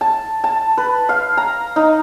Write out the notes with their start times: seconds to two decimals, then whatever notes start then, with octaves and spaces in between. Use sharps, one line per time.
0.01 A5
0.44 A5
0.78 B4
1.09 F5
1.37 A#5
1.76 D#4